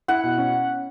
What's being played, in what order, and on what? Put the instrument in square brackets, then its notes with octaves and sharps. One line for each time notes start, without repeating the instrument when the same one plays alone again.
[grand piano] E4 [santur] F#5
[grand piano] B2
C#4